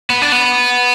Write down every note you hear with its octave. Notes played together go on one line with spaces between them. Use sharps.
B3
D4
B3